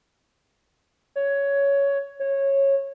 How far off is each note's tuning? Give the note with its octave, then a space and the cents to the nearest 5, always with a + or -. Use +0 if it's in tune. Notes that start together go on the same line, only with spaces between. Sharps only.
C#5 +10
C#5 -15